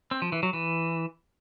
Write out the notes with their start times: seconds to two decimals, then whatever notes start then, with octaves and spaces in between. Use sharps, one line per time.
0.11 C4
0.22 F3
0.32 E3
0.43 F#3
0.53 E3